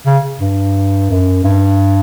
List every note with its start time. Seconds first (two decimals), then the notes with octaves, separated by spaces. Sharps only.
0.06 C#3
0.41 G2
1.10 F#2
1.44 G2